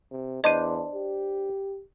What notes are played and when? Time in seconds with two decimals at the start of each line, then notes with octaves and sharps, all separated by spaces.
0.12 C3
0.44 E2 D4 C5 D#5 D#7
0.95 G4